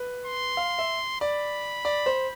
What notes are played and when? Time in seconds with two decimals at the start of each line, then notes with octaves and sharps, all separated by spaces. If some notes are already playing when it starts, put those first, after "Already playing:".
Already playing: B4
0.26 C6
0.57 F5
0.79 E5
1.21 D5 B5
1.85 D5
2.06 C5